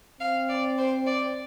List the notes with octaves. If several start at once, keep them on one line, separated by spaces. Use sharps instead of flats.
C4 F5
D5
C5
D5